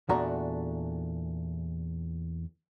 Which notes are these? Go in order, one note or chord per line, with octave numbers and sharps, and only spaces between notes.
E2 A#2 A3 D4 F#4 A#5